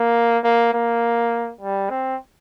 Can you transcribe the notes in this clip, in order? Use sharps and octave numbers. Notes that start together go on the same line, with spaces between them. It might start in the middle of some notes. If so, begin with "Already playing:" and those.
Already playing: A#3
A#3
A#3
G3
C4